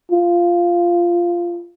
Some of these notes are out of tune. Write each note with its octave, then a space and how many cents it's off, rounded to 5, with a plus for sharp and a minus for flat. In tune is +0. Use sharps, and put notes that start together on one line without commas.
F4 -10